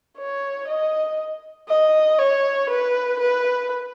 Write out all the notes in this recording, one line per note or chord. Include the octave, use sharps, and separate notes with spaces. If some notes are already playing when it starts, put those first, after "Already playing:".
C#5
D#5
D#5
C#5
B4
B4